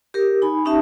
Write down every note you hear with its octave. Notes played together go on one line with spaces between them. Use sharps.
G4 A#4
D#4 G#5 B5
C#4 D#4 G4 E5 A5